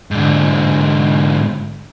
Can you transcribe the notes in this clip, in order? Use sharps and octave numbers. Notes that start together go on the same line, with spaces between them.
G#2 D3